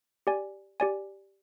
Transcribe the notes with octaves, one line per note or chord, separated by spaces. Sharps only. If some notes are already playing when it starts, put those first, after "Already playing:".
G4 D5 G#5
G4 D5 G#5